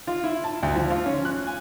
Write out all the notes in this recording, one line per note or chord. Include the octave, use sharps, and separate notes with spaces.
F4
E4
A5
D2
F3
F4
C#4
F#6
G#5